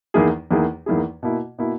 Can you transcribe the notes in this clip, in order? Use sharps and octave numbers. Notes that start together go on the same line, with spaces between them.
E2 D#3 A#3 E4 G#4
E2 D#3 A#3 E4 G#4
E2 D#3 A#3 E4 G#4
B2 A#3 E4
B2 A#3 E4